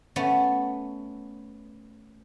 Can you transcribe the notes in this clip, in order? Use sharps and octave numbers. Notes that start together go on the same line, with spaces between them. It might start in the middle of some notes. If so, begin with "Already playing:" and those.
A3 B3 C#4